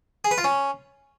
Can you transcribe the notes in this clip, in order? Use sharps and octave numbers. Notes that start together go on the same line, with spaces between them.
G#4
B4
F4
C#4